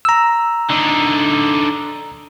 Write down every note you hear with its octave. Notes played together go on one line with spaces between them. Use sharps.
A#5 E6
D3 D#4